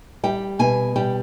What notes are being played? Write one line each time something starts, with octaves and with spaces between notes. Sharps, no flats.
G3 G5
B2 G#5
G3 G5